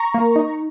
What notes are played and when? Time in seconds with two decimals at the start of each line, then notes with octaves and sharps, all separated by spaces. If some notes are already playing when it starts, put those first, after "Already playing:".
Already playing: A#5 C#6
0.14 A#3
0.36 D#4